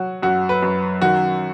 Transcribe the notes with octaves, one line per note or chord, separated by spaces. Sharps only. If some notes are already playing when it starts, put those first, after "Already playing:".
Already playing: F#3 F#4
F#2 F#4
B4
F#2
D#3 F#4